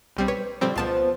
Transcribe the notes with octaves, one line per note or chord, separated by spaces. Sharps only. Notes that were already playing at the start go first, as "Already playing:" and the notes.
B1 G3 C4
B4 C#5
F#2 D3 F3 G3 C4
C#2 F3 B3 F4 A5